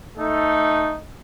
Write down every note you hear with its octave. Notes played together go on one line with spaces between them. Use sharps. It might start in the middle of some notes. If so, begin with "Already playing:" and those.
A3 D#4 A4